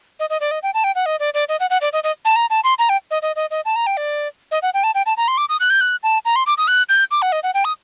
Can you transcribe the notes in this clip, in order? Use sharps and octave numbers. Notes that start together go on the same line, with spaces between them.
D#5
D#5
D5
D#5
G5
A5
G5
F#5
D#5
D5
D5
D#5
F#5
F#5
D5
D#5
D#5
A5
A#5
A5
C6
A#5
G5
D#5
D#5
D#5
D#5
A5
A#5
G5
D5
D#5
F#5
G5
A5
G5
A5
A#5
C6
D6
D#6
F#6
G6
F#6
A5
A#5
C6
D6
D#6
F#6
G6
D6
F#5
D#5
F#5
G5
D#6